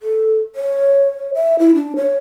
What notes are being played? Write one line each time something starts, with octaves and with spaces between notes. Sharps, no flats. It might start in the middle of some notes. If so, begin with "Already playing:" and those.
A4
C#5
E5
E4
D4
C#5